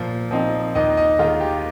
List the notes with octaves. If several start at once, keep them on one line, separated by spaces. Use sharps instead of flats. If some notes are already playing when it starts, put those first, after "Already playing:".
Already playing: A#2 F3
F3 C4 D#4
D#2 D#4 D#5
D#4 D#5
D#3 G#3 F4
G4